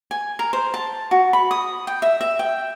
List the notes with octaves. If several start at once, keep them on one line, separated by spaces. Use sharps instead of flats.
G#5
A#4
C5
A5
F#4
B5
D#6
G5
E5
E5
G5